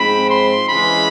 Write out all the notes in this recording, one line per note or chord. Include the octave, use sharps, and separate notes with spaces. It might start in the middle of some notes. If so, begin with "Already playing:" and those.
Already playing: G#2 F3 G#3 C4 B5
C6
C#3 E3 G#3 B5